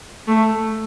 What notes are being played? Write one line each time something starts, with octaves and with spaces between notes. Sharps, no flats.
A3